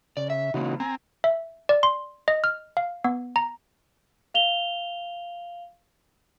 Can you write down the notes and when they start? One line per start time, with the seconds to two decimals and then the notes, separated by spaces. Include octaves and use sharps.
0.17 C#3 D5
0.30 E5
0.54 C#3 E3 A#3 C#4 D#4 F#4
0.80 C4 G#5 A#5
1.24 E5
1.69 D5
1.83 C6
2.28 D#5
2.44 F6
2.77 F5
3.04 B3
3.36 A#5
4.34 F5 F7 G7